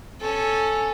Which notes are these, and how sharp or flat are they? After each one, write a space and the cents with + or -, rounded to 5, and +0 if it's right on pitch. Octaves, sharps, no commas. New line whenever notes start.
C#4 +0 A4 +0